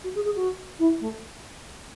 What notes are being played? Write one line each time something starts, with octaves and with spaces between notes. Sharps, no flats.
F#4
G#4
G#4
F#4
E4
A3